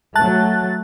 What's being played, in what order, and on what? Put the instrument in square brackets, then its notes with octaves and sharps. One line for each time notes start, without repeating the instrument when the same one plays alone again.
[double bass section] F#3 A3 [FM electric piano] A5 F#6 A6